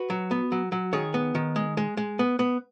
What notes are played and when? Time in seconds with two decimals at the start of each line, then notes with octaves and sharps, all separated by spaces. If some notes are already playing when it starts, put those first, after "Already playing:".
Already playing: F#4 B4
0.10 F#3
0.31 B3
0.52 F#3
0.72 F#3
0.93 D#3 G#4 C#5
1.14 B3
1.35 D#3
1.56 G#3
1.77 G#3
1.97 G#3
2.19 B3
2.39 B3